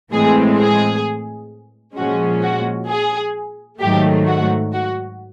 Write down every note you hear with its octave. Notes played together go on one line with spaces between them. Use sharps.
A2 E3 G#3 C4 G#4
G#4
A#2 F3 G#3 C#4 F#4
F#4
G#4
G#2 D#3 F#3 A3 G4
F#4
F#4